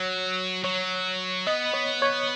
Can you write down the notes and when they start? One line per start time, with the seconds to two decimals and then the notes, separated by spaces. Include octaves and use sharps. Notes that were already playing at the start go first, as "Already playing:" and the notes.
Already playing: F#3 C#5
0.64 F#3 C#5
1.47 B3 D#5
1.73 C#5
2.02 C#5